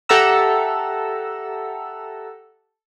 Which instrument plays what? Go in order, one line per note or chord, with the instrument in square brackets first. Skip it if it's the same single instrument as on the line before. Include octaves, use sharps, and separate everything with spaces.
[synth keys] G4 A4 E5 F#5 A#5 E6